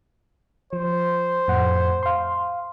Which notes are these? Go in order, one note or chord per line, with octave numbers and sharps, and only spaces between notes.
F3 C5
F2 A2 F#5
F5 C6